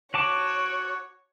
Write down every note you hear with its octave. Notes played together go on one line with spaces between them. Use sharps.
F#4 C#5 A5 D6